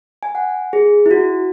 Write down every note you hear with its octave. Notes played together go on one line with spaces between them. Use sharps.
G#5
F#5
G#4
E4
F#4